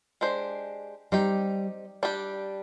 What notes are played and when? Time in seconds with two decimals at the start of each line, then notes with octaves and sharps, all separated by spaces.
0.21 G#3 D4 G4 C5
1.12 G3 C4 D#4 G4
2.03 G3 D4 G4